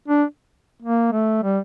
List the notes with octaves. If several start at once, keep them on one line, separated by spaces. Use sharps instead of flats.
D4
A#3
A3
G3